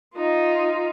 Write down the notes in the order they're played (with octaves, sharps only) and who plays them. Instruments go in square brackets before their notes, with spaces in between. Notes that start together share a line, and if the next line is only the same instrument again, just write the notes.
[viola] D#4 F4